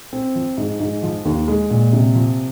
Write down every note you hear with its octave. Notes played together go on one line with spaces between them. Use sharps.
C4
F3
G#2
G#2
F3
D#2
G#3
A#2
C3
F3